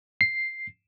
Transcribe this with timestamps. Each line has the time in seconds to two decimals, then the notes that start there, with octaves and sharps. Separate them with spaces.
0.21 C7